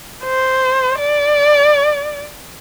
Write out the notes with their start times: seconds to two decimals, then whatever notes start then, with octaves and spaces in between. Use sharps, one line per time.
0.24 C5
0.98 D5